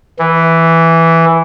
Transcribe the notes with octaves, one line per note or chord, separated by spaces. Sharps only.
E3